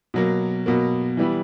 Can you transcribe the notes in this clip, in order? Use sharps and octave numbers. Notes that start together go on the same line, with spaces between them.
B2 F#3 A#3
B2 F#3 A#3
E3 G3 B3 E4